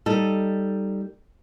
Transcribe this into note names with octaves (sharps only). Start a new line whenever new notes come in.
G3 D#4 A4